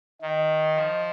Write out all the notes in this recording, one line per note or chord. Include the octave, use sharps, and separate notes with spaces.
D#3 D#5
F3